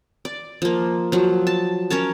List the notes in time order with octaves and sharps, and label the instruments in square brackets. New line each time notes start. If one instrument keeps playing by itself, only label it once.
[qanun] D5
F3 A#3
F3 F#3
A5
C#4 A#4 C#5 A5